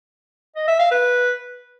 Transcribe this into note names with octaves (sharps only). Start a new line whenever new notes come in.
D#5
E5
F5
B4